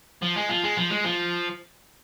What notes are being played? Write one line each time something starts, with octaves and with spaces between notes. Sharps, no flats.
F3
G#3
F3
G#3
F3
G#3
F3